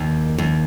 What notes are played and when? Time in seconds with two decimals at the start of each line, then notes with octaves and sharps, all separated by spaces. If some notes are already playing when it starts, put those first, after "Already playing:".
Already playing: D#2
0.38 D#2